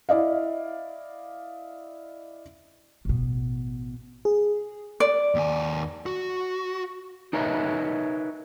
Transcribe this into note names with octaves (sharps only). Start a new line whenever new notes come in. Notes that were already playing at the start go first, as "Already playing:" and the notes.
E4 D5 D#5 F5
A1 B2
G#4
D5
D#2 G#5
F#4
D#4 A#4 B4 C#5 D#5 E5